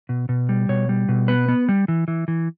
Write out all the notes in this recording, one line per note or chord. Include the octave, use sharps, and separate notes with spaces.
B2
B2
G3
B2 C#5
G3
B2
B3 B4
B3
G3
E3
E3
E3